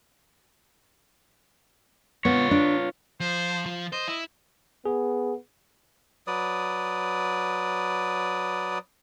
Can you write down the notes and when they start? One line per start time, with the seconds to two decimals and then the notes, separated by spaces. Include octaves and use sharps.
2.25 B3 F4 C#5
2.51 D4
3.20 F3 C5
3.66 F3
3.92 C5 D#5
4.08 E4
4.86 B3 G#4
6.27 F#3 B4 D5 D#6